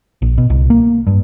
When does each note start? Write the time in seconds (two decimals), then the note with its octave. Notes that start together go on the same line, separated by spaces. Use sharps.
0.22 A#1
0.38 B2
0.50 C2
0.70 A#3
1.07 G2